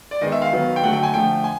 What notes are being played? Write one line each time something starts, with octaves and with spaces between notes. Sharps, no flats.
D5
D#3 G#3 B3 D#5
E5
F5
D#3 F#3 B3
G5
D3 F#3 A3 F#5
G5
G#5
D3 F3 A3 G5
G#5